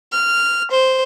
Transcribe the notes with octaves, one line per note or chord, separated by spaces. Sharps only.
F6
C5